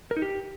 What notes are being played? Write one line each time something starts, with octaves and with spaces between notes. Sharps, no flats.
A#4
D#4
G4